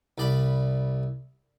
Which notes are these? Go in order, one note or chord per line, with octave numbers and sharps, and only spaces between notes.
C2 D5 B5